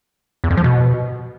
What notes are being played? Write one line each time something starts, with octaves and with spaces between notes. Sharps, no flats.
E2
F2
F3
B2